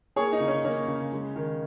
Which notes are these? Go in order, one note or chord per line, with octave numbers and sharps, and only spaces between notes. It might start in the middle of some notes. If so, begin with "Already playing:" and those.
A#3 G#4 C#5
D#4
C#3
C#4
A#3 C#4
C#3
G#3
D#3